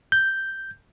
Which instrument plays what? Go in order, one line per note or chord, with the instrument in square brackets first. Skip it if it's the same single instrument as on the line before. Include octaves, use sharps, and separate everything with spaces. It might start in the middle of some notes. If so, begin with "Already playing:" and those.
[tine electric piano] G6